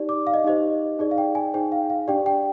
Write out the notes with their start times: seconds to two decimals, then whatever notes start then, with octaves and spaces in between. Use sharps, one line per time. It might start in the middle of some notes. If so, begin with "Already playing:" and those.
Already playing: D#4 G4 D5
0.09 D6
0.27 F5
0.34 D#5
0.44 D#4 G4 C5 D#5
0.99 D#4 G#4 D5
1.11 F5
1.18 G5
1.35 G#5
1.54 D#4 G#4 C5 G5
1.72 F5
1.90 F5
2.08 D4 G4 D5 G5
2.26 G5